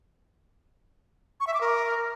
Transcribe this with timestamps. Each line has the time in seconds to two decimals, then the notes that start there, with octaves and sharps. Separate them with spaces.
1.40 C#6
1.47 E5
1.54 D6
1.61 A#4